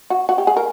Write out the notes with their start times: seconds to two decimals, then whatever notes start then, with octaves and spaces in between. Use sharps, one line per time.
0.10 F#4
0.29 F#4
0.38 G4
0.47 G#4
0.57 A#4